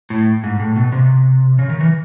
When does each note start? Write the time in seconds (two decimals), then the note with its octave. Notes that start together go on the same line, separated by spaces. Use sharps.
0.10 A2
0.44 G#2
0.60 A2
0.76 B2
0.92 C3
1.59 C#3
1.70 D#3
1.81 E3